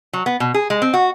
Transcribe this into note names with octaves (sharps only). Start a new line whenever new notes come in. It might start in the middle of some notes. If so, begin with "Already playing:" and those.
F#3
B3
B2
G#4
G#3
C4
F#4